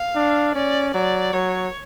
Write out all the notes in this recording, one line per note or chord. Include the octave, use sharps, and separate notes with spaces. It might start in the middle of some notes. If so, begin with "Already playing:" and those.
Already playing: F5
D4
C#4 D5
F#3 D5
F#3 C#5